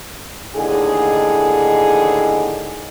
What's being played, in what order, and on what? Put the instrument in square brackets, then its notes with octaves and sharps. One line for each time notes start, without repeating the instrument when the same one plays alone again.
[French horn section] D#2 A2 D3 D#4 G#4